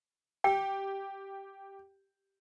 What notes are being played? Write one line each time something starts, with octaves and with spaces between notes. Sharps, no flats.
G4 G5